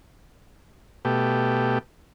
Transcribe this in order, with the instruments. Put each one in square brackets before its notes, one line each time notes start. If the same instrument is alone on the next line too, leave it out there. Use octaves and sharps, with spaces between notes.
[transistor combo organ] B2 A3 G4